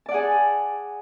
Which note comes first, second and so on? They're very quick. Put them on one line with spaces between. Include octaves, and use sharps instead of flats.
A5 D5 F#5 G#4